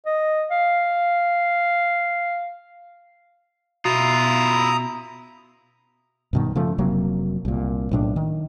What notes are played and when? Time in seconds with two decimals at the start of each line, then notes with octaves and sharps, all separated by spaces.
0.06 D#5
0.51 F5
3.85 B2 E4 F4 A#5 D#6
6.33 G2 B2 D#3
6.56 C#3 F3 A3
6.78 F1 C3 F#3 A#3
7.45 C2 A#2
7.91 B1 A2 D4
8.16 D#3